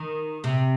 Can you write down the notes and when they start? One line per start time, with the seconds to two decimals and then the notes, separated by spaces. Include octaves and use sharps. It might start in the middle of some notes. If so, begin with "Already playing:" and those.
Already playing: D#3
0.44 C3